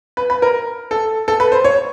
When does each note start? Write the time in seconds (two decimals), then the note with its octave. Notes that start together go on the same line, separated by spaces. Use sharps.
0.17 B4
0.30 B4
0.42 A#4
0.91 A4
1.28 A4
1.40 B4
1.52 C5
1.64 C#5